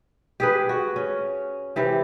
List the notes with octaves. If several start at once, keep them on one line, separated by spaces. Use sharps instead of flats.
G4 G#4 B4
F#4
C#4
C3 E3 G4